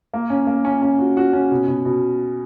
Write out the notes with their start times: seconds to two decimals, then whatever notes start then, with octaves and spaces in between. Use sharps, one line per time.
0.13 A#3
0.30 C#4
0.47 A#3
0.65 C#4
0.82 C#4
0.99 F#4
1.17 F#4
1.33 C#4
1.51 B2
1.68 B2
1.85 B2